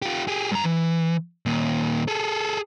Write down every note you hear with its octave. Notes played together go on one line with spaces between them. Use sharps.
F4 G4
G4 G#4
G2 A#5
E3
D#2 A#2
G#4 A4